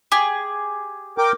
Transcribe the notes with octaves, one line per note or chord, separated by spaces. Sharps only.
G4 G#4
A#4 G5 D6